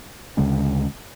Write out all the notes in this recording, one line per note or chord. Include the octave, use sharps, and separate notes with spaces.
D2 C#3 G#3 C#4